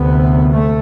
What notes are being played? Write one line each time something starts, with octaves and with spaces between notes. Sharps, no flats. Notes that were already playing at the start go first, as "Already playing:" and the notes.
Already playing: D2 C3 B3
A3